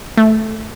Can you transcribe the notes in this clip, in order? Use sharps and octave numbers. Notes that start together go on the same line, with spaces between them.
A3